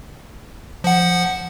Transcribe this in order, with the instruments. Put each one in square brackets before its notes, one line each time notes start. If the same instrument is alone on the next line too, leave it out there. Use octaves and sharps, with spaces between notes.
[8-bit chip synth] F3 F#5